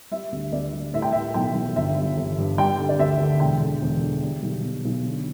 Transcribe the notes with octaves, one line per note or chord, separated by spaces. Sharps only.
G3 E5
D2
D2 D5
G3
A2 E5
G5
A2 E5
B1 G5
B1
G1 E5
G3
G1
G2
G3 G5
D3
D5
D2 E5
D3
E1 G5
D3
E1
D3
G3
B1
B2
B1
D3